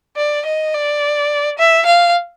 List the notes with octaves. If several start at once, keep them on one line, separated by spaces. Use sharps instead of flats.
D5
D#5
D5
E5
F5